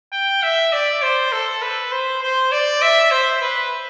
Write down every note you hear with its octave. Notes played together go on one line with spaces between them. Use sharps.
G5
E5
D5
C5
A4
B4
C5
C5
D5
E5
C5
B4